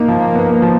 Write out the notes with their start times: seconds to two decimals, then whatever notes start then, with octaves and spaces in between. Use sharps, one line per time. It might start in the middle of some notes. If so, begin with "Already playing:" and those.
Already playing: A#3 D#4
0.08 F3
0.35 B3
0.62 F3